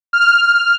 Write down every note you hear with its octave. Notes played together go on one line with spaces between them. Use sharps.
F6